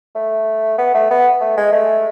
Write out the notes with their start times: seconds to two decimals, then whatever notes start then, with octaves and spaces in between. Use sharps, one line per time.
0.15 A3
0.78 B3
0.94 A3
1.11 B3
1.41 A3
1.57 G#3
1.72 A3